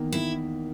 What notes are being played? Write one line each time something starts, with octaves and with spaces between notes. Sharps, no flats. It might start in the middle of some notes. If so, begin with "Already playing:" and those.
Already playing: E2 D#3 A#3
E4